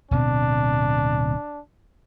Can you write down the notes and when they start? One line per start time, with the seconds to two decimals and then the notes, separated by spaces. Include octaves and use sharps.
0.11 D1 B2 C4 D4